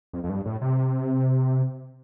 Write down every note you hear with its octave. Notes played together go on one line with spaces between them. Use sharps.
F2
F2
G2
A2
C3